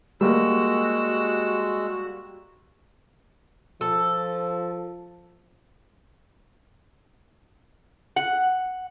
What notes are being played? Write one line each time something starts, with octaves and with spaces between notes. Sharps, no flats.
G3 G#3 A#3 F#4 E6
F3 A4
F#5